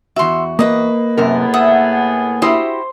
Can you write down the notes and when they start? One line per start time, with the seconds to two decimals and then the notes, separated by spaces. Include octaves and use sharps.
0.16 E2 F#4 E5 C6
0.59 A#3 B4 D#5 D#6
1.17 F#2 A2 C3 B3 G#4 A#4
1.54 E5 F#5 D#6
2.42 E4 F#4 G4 C5 C6 D#6